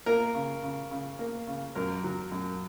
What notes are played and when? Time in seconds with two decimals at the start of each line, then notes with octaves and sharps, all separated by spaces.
0.06 A#3 A#4
0.34 C#3
0.63 C#3
0.91 C#3
1.19 A#3
1.47 C#3
1.75 F#2 A#4
2.04 F#3
2.32 F#2